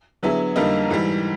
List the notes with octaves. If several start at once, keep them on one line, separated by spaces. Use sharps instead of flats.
D3 F#3 B3 E4 G#4
F2 D3 G3 A#3 D#4
G#2 E3 G3